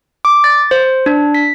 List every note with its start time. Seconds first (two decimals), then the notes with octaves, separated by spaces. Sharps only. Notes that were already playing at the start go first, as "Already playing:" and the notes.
0.25 D6
0.44 A6
0.71 C5
1.06 D4
1.34 B6